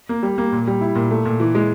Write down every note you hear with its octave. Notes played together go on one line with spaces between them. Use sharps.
A#3
G3
A#3
A#2
G3
E4
A#2
A3
A#2
E3
G#3